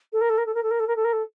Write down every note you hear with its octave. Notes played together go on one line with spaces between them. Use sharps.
A4
A#4
A4
A#4
A4
A#4
A4
A#4
A4
A#4
A4
A#4
A4